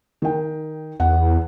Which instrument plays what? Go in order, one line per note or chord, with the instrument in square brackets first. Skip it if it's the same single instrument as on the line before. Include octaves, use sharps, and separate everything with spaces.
[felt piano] D#3 G5
[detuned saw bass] E2 [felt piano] F#5